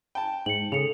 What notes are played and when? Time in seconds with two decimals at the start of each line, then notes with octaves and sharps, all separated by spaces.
0.15 G5 A5
0.46 G#2 C#7 F#7
0.72 C#3 A4 C#7 F7